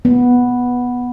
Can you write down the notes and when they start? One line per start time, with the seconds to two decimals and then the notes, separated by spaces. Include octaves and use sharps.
0.05 B3